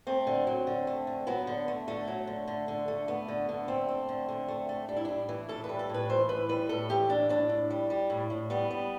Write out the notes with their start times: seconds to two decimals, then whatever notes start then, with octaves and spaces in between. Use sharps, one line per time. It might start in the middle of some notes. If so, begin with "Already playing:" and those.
0.07 A3 C4
0.27 D3
0.47 F#3
0.67 D3
0.87 A3
1.07 D3
1.27 F#3 B3
1.47 D3
1.68 A3
1.88 D3 A3
2.08 F#3
2.27 D3
2.48 D3
2.68 D3
2.88 A3
3.08 A3 B3
3.28 D3
3.49 D3
3.68 A3 C4
3.88 A3
4.09 D3
4.29 D3
4.48 A3
4.69 A3
4.88 G3 D4
4.97 E4
5.05 A2 D4
5.29 E3
5.49 A2 A4
5.64 B4
5.69 G3
5.79 A4
5.89 A2 B4
6.09 E3 C5
6.29 A2 B4
6.49 G3 B4
6.69 A2 A4
6.89 E3 G4
7.09 A2 D4
7.29 A2 D4
7.49 A2
7.70 G3
7.90 G3
8.10 A2
8.30 A2
8.50 G3 B3
8.71 G3